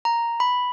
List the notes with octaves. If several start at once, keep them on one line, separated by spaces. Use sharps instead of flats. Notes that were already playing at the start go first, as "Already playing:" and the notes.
A#5
B5